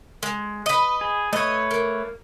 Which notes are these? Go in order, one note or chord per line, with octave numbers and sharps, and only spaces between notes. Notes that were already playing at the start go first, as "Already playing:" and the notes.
G#3
B4 D#5
G#4
A3 B4 C#5 D#5
A#3